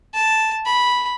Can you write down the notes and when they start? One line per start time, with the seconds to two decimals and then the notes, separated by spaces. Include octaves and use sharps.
0.14 A5
0.66 B5